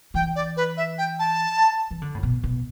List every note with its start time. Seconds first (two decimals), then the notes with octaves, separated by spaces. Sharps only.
0.14 E3 G5
0.35 D5
0.56 B4
0.77 E5
0.98 G5
1.19 A5
1.91 E3
2.02 D3
2.14 A2
2.23 B2
2.44 B2